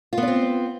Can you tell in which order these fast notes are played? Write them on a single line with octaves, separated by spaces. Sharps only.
F4 B3 D4 C4